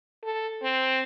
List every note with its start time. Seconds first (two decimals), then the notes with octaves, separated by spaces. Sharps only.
0.24 A4
0.62 C4